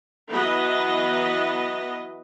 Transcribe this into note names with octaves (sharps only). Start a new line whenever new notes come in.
E3 F#3 B3 B4 D#5